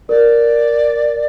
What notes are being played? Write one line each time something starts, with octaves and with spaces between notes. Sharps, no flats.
A#4 D5